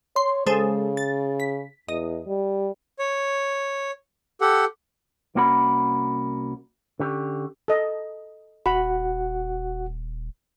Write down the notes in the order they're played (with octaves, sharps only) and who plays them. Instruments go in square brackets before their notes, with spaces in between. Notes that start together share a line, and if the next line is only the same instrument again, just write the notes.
[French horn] C#5 [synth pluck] C6
[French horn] C#3 [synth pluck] G#3 A4 C5
[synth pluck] A6
B6
[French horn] E2 [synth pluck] D#5
[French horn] G3
[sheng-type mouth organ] C#5
G4 A4 F#5
[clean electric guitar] C2 A#3 C#4 F#4 A#4 B5
D3 C#4 G4
[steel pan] A4 D#5
[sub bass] D#1 [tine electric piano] F#4 F#5 [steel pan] B5